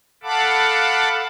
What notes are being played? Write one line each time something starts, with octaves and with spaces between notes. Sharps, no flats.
A4 F5 F#5 A5 B5 D6